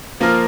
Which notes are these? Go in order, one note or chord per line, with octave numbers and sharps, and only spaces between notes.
F3 A#3 F4 A#4